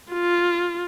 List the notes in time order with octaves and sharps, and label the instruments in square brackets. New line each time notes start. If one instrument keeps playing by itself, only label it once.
[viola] F4